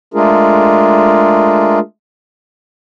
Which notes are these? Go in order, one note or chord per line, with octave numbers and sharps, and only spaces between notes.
G#3 A3 D4 F4 G#4 A#4